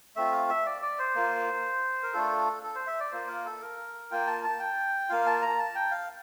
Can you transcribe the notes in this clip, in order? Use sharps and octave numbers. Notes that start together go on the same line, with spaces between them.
A3 C4 F4 E5
F5
E5
D5
D5
C5
A#3 F4
A#4
A3 D4 F4 A4
A4
C5
E5
D5
A#3 F4 C5
A#4
A4
A#4
A#3 F4 G5
A5
A5
G5
A#3 F4 F5
A5
A#5
A5
G5
F5